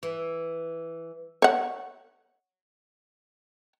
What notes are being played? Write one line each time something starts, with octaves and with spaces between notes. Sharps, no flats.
E3
C#5 F#5